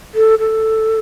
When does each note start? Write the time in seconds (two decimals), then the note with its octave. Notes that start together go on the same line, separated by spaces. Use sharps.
0.15 A4
0.39 A4